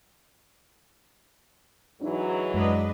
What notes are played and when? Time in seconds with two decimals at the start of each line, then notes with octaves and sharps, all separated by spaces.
2.01 G#2 E3 F#3 D4 D#4
2.54 F#2 G#3 D4 B4 D#5